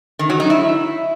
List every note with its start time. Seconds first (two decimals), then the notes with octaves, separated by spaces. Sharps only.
0.19 D#3
0.30 F#3
0.40 D#4
0.50 E4